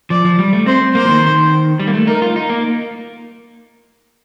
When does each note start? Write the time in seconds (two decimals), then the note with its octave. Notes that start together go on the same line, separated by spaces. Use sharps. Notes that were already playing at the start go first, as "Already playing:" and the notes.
0.10 F3 D5
0.24 F3
0.39 G3
0.53 A3
0.66 C4 C5
0.94 A#3 C5
1.05 F3
1.09 D#3
1.80 G3
1.87 A#3
1.94 A3
2.07 D#4 A#4
2.22 F4
2.36 D#4
2.49 A#3